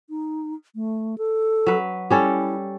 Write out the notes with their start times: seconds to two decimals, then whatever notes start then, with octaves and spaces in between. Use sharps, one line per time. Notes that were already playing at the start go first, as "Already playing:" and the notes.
0.10 D#4
0.75 A3
1.18 A4
1.67 F#3 B4
2.10 G3 C#4 E4 A4